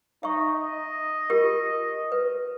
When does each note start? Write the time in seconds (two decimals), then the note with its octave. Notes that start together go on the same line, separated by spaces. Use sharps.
0.23 D#4 E5 C#6
0.55 D#5
1.30 F4 G4 A#4
2.12 B4